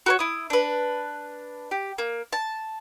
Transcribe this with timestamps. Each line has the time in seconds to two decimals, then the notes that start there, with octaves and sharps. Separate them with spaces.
0.06 F#4 A#4 C#5
0.19 E4 D#6
0.50 D4 B4
1.71 G4
1.98 A#3
2.33 A5